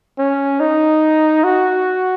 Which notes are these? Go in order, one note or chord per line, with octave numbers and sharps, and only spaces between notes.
C#4
D#4
F#4